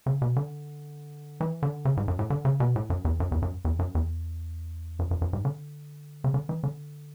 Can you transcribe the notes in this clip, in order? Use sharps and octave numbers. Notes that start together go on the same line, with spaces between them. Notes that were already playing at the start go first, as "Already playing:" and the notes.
C#3
B2
D3
E3
D3
C#3
G#2
F#2
A2
D3
C#3
B2
A2
F#2
E2
F#2
E2
F#2
E2
F#2
E2
F#2
F#2
F#2
G#2
D3
C#3
D3
E3
D3